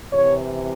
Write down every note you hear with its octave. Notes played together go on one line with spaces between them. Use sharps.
C3 E3 C#5